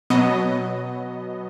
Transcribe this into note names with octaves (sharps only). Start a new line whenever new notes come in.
B2 F#3 B3 D#5